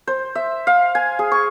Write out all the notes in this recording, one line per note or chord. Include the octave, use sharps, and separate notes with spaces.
C5
E5
F5
G#5
G#4
C#6